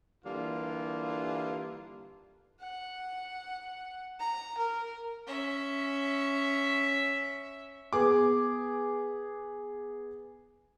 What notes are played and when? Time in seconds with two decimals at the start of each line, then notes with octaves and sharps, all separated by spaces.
0.25 D3 E3 G3 A#3 F4
2.60 F#5
4.20 A#5
4.58 A#4
5.27 C#4 E5
7.93 B3 G#4 D6